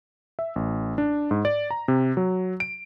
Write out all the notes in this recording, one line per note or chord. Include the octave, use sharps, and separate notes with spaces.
E5
A1
D4
G#2
D5
A#5
C3
F#3
D7